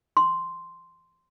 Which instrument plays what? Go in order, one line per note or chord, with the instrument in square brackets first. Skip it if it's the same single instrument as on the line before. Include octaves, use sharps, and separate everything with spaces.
[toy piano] C6